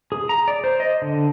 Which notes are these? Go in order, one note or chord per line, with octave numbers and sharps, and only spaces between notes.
G#4
A#5
D5
C5
D#5
D3